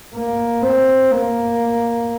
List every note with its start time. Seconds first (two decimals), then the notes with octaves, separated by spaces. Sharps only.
0.15 A#3
0.62 C4
1.11 A#3